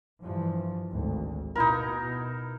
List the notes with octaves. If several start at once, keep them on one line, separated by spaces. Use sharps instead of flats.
G2 E3 F3
G#1 D2
B2 D#4 E4 A#4